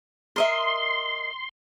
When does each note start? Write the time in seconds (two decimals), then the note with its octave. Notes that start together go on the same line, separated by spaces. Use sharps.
0.36 A#4 D#5 E5 C6